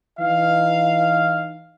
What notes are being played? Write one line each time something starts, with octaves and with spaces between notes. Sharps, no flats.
E3 D#4 F5